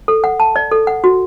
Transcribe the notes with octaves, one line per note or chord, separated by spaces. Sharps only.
A4
F#5
A5
D5
A4
F#5
F#4